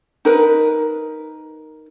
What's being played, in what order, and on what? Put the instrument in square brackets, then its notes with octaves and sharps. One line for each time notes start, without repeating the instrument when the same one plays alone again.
[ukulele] D#4 A#4 B4